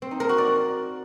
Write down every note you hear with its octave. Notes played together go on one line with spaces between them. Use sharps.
C4
D#4
A#4
F#4
D5